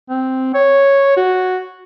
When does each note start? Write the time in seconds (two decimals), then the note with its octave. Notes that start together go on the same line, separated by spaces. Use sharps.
0.10 C4
0.54 C#5
1.17 F#4